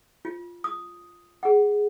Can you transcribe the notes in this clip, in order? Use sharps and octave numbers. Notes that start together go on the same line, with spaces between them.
F4
D#6
G#4 F#5